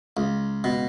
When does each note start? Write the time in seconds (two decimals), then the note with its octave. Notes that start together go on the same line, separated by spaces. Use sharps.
0.17 C#2
0.64 B2